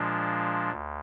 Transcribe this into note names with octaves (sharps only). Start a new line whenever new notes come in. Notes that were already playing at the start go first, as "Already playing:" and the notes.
Already playing: A#2 F3 G#3 D4
D2